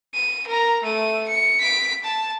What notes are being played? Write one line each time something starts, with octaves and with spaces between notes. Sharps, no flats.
D#7
A#4 A#5
A3 D#7
C#7
B6 D7
A5